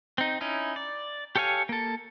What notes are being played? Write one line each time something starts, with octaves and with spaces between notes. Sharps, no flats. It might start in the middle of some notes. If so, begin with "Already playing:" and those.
C4 D#4
C#4 D#4 E4
D5
G4 A4 C#5 F5 G#5
A#3 A4